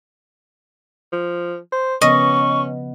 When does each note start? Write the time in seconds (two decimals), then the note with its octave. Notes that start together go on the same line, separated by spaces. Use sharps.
1.12 F3
1.72 C5
2.02 C#3 F3 B3 C#4 D#5 C#6